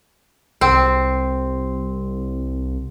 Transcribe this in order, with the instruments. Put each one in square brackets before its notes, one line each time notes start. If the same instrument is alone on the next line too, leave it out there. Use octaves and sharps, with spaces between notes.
[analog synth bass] C2 [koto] C4